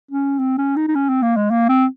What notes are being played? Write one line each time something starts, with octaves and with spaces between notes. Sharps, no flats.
C#4
C4
C#4
D#4
D#4
C#4
C4
A#3
G#3
A#3
C4